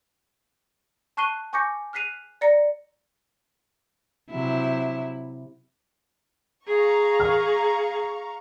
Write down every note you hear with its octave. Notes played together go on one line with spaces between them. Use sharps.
A5 C#6 F#6 C7 D#7 G7
G#5 C#6 D6 G6 A#6 C#7
F6 F#6 B6 C7 D#7 F7
D5 A#5 A#6 C#7
C3 F#3 E4
G#4 F5 A#5 C#6
F6